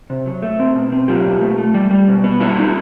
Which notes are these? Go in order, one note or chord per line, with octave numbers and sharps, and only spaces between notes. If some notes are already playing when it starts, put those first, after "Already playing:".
C3
F#3
A3
C4
B2
C4
F#3 F4 G4
B2
A3
A3
G3
G3
B2
B3
G3 E4 F#4
D#4